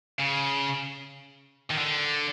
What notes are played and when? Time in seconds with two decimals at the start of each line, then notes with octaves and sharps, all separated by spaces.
0.20 C#3
1.71 D#3
1.78 D3